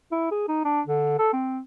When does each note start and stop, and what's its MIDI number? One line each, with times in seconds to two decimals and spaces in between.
0.12 0.30 64
0.31 0.44 68
0.48 0.62 63
0.65 0.81 62
0.87 1.15 50
1.19 1.30 69
1.33 1.60 60